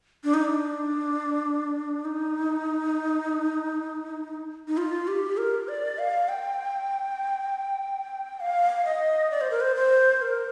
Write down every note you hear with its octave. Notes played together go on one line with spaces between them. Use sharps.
D4
D#4
D4
D#4
D#4
F4
G4
A#4
D5
F5
G5
F5
D#5
D5
C5
A#4
C5
C5
A#4